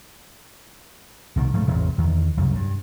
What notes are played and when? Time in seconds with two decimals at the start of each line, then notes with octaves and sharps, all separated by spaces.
1.36 C2 B2 D#3
1.54 G#2 F3 A3
1.67 A1 E2 C3
1.98 E2 D#3
2.37 C2 F#2 C#3
2.55 G2